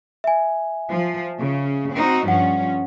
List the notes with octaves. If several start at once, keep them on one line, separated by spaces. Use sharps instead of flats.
E5 G#5
F3
C#3
C4 D#4 F#4
G2 F3 C#4 F#5